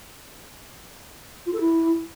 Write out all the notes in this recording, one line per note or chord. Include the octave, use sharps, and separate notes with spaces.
F4
A4
E4